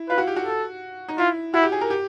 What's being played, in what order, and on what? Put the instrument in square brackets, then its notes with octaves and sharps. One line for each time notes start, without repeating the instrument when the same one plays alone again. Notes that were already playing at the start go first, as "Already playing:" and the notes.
Already playing: [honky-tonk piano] E4
[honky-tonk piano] F4 [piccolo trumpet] B4
[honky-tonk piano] F#4
G4
F#4
[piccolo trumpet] A4
[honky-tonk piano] D#4
[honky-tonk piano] E4 [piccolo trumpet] F4
[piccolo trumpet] E4 [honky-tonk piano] F#4
[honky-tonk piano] G4
G#4
A#4
G4